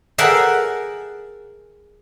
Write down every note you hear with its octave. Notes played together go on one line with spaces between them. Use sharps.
G#4 A#4 E5 F#5 G5 A5